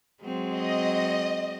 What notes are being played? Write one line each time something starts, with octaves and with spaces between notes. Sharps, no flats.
F#3 G#3 C4
D#5